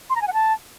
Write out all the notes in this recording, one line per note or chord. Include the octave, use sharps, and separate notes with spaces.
C6
A#5
G#5
F#5
A5